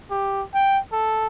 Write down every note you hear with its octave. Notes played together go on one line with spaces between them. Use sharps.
G4
G5
A4